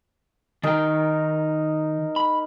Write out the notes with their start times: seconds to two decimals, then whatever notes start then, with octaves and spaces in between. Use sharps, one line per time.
0.63 D#3 D#4 A#4 G5
2.16 B5